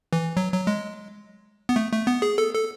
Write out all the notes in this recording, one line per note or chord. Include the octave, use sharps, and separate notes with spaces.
E3
F#3
F#3
G#3
B3
A3
A3
B3
G#4
A4
A4